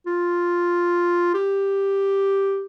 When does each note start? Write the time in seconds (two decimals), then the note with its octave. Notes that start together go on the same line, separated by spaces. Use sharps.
0.07 F4
1.34 G4